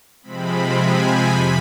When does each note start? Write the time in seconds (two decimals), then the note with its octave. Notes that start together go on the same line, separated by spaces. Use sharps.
0.23 C3 F3 G#3 C4 B5
0.76 G#5
1.29 F2 C3 B5